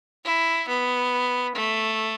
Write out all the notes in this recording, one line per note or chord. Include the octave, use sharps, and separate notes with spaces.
E4
B3
A3